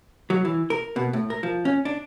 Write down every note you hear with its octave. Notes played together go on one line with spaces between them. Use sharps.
F#3
E3
A#4
B2
A2
A#4
F3
C#4
D4